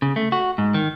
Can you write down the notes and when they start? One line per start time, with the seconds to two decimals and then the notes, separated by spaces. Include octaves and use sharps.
0.02 C#3
0.16 A3
0.32 F#4
0.58 G#2
0.74 D#3